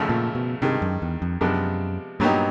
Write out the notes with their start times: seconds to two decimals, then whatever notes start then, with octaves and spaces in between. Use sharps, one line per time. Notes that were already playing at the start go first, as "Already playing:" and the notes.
Already playing: G#1 F#2 C#3 F3 A3
0.09 A#2
0.35 B2
0.62 G2 C3 D#3 G#3
0.82 F#2
1.02 E2
1.22 F2
1.41 F#2 C3 F3 G#3 B3 D4
2.20 G2 A#2 F#3 B3 D#4 G4